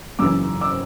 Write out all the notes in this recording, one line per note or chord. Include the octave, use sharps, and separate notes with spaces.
F#2 C#3 E3 D6 E6
D6 E6